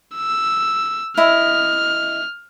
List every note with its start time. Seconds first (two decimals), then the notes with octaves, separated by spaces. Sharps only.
0.16 E6
1.17 E4 D#5 F6